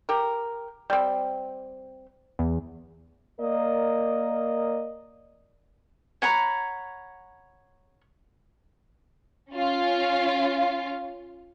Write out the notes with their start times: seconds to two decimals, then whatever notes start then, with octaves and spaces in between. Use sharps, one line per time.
0.09 G4 A#4
0.90 G3 C4
2.39 E2
3.40 A#3 A#4 D5 D#5
6.22 C#5 F#5 A#5 B5
9.52 C#4 F4